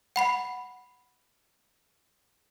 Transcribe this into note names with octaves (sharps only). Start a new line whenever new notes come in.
F#5 B5 C7